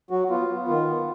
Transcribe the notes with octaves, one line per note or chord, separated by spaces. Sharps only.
F#3 F#4
B3 F4
B3
D#3 F4
B3